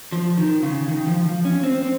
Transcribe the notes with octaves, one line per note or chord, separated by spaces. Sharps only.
F3
D#3
C#3
D#3
F3
F3
C#4
C4
C4